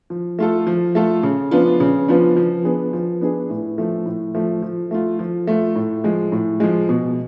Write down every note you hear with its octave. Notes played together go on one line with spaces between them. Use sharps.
F3
A3 F4 A4
F3
A3 F4 A4
C#3
F3 B3 D4 F4
C#3
F3 B3 D4 F4
F3
B3 D4 G#4
F3
B3 D4 G#4
A2
F3 A3
A2
F3 A3
F3
A3 F4
F3
A3 F4
A2
F3 G#3
A2
F3 G#3
B2